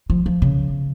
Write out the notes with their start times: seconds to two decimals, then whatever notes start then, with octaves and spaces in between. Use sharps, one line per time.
0.10 F3
0.26 F3
0.42 C#3